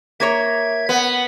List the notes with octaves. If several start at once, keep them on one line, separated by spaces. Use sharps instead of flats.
A#3 A#4 C#5 E5 G#6
B3